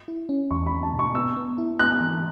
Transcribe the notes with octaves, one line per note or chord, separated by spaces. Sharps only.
E4
C#4
E2 C#6
B5
E2
A5
B2
C#6
B3 E6
B3
E4
B3 F#6
E3